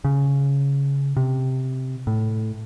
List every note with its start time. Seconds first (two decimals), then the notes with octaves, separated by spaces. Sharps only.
0.04 C#3
1.17 C3
2.07 A2